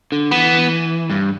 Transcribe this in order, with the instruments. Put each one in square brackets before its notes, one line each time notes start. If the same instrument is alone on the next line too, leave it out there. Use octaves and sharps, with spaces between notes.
[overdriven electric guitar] D3
[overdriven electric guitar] E3 [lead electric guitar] B3
[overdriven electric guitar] G2